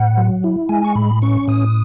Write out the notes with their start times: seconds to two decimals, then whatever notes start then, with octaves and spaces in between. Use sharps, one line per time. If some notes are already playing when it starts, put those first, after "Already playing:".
Already playing: A2 F#5
0.17 F#3
0.44 E4
0.69 G#3 G#5
0.84 C#6
0.95 A2 B5
1.22 C#4 C#6
1.48 A2 D#6